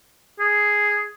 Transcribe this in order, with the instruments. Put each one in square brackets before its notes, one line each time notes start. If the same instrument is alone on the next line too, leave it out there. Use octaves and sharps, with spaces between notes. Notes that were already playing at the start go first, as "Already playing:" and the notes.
[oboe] G#4